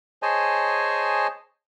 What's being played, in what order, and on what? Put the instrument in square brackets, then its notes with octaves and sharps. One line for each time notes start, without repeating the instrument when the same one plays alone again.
[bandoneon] G#4 C5 C#5 D#5 G#5 A5